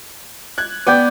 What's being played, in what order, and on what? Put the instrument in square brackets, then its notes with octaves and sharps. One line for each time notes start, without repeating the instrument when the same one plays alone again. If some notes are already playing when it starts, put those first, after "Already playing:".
[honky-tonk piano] F#6 G#6
[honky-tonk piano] B3 [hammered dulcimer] D5 G5